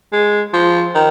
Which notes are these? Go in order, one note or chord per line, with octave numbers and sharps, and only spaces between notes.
G#3
F3
D#3